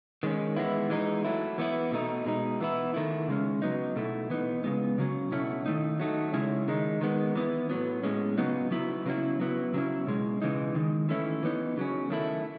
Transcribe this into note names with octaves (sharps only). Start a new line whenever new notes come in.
D#3 G#3 C#4
E3 G#3 B3 E4
E3 G#3 D#4
F#3 A3 E4
E3 B3 E4
B2 A3 D#4
B2 G#3 D#4
E3 B3 E4
D#3 A3 E4
C#3 G#3 C#4
F#3 B3 D#4
B2 A3 E4
E3 B3 D#4
C#3 G#3 B3
C#3 F#3 C#4
B2 A3 C#4 E4
D#3 A3 D#4
F#3 A3 D#4
C#3 G#3 C#4 E4
D#3 G#3 D#4
D#3 G#3 B3
E3 B3 E4
A2 F#3 B3
A2 G#3 C#4
C#3 F#3 B3 D#4
F#3 B3 E4
C#3 F#3 C#4 E4
F#3 B3 E4
C#3 F#3 C#4 E4
B2 G#3 C#4
C#3 E3 G#3 D#4
D#3 G#3 D#4
E3 A3 C#4 E4
E3 B3 D#4
C#3 F#3 C#4
D#3 A3 E4